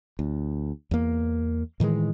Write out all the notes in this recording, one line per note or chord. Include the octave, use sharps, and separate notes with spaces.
D2
E2 A#3
A2 D#3 E3 G#3